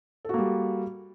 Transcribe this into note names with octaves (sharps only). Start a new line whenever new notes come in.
G3 A#3 F#4 A4